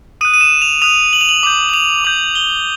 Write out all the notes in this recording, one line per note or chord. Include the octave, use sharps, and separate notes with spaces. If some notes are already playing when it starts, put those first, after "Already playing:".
D#6 F#6 D#7
D#7
E7
F7
D#6 F#6 F7
F#7
F7
F#7
D6 G6 F#7
F#7
F7
D6 G6 F#7
G7